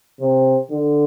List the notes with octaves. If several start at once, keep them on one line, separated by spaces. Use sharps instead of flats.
C3
D3